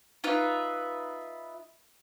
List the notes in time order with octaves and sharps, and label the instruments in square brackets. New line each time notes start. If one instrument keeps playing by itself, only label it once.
[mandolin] D#4 F4 B4 E5